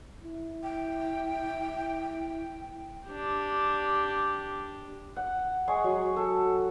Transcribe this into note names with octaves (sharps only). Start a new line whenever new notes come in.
E4
G5
D4 G4
F#5
G#3 G#4 C#6
F#3
A4